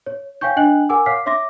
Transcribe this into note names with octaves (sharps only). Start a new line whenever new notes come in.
C#5
C#5 F5 G5 G#5 C#6 G6
D4 D#5 G5 G#5 F#6 F#7
A#4 F#5 G#5 D6 E6
C#5 F5 D6 F6 B6 C7
C#5 E5 C6 D6 A#6